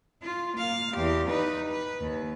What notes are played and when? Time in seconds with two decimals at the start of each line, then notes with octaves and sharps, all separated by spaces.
0.22 F4
0.57 A#3 F5
0.94 E2 G4
1.29 D#4 B4
1.71 B4
2.01 D#2